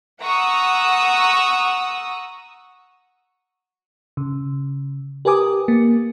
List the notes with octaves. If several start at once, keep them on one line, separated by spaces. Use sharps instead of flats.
F#5 A#5 C#6 D#6 E6
C#3
G4 A#4 B4 G#5 D6 D#6
A#3